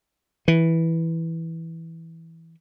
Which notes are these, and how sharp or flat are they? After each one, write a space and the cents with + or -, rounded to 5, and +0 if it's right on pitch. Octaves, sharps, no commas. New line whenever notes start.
E3 -5